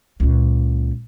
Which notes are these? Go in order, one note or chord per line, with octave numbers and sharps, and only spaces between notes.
C#2 A#2